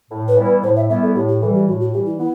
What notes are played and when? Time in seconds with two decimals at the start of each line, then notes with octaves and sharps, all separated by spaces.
0.11 A2
0.28 B4
0.37 E3 G3 B3 E4
0.45 B4
0.63 A2 C5
0.76 E5
0.89 E3 G3 B3 E4 E5
1.03 A4
1.15 A2 G4
1.28 G4
1.41 E3 G3 A4
1.54 G4
1.68 A2 F#4
1.80 F#4
1.94 E3 G3 G4
2.06 E4
2.19 B3 E4